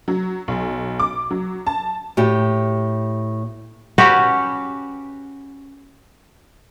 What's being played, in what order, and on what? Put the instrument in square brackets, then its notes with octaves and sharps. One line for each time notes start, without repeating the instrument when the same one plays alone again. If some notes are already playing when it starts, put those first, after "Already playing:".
[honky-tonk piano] F#3
B1
D6
F#3
A5
[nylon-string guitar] A2 G4
[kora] C#4 F#4 G4 B4